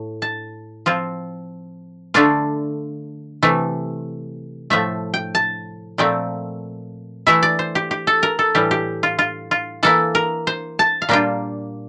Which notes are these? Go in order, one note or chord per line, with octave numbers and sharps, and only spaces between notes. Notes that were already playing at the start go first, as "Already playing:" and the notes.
Already playing: A2
A5
F3 C4 F4
D3 A3 D4 F4 D5
C3 E3 A3
A2 F3 A3 E5
G5
A5
A#2 F3 A3 C4 G5
E3 A3 E4 E5
D5
C5
G4
G4
A4
A#4
A4
A2 E3 G3 G4
G4
F4
F4
F4
E3 A#3 E4 A4
A#4
C5
A5
F5
A#2 G3 A#3 D4 F4 G5